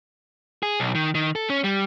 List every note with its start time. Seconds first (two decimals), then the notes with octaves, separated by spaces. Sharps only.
0.63 G#4
0.80 B1
0.95 D#3
1.15 D#3
1.36 A4
1.50 C#4
1.64 G3